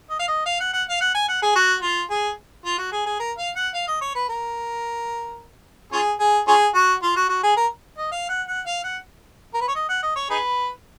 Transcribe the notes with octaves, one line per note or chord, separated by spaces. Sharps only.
D#5
F5
D#5
F5
F#5
F#5
F5
F#5
G#5
F#5
G#4
F#4
F4
G#4
F4
F#4
G#4
G#4
A#4
F5
F#5
F5
D#5
C#5
B4
A#4
C#4 F4 G#4
G#4
C#4 F4 G#4
F#4
F4
F#4
F#4
G#4
A#4
D#5
F5
F#5
F#5
F5
F#5
A#4
B4
C#5
D#5
F#5
D#5
C#5
D#4 G#4 B4